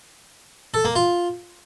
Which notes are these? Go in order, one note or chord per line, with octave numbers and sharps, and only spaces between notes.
A4
A#3
F4